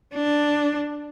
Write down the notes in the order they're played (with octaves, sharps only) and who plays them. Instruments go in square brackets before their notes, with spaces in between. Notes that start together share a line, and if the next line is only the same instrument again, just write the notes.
[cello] D4